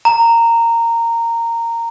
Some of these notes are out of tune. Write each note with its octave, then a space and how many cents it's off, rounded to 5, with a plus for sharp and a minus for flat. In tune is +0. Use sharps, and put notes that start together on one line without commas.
A#5 -15